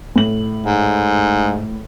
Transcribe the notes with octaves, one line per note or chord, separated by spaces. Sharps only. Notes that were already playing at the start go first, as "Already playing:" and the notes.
A2 F#7
G#2